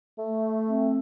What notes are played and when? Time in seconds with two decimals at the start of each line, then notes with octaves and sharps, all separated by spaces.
0.19 A3
0.64 C4